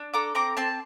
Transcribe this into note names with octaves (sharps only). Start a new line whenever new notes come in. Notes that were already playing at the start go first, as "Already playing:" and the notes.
Already playing: D4
A4 A#5 D6
C4 A#5 D6
C4 A5 C6